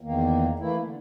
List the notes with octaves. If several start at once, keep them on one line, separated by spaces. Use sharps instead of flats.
E2 D#3 A#3
E3 A3 A#3 E4
D3